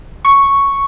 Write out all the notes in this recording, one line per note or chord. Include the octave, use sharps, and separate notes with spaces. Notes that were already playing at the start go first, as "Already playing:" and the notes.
C#6